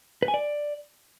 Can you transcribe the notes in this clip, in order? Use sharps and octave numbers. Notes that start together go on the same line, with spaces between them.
B4
G#5
D5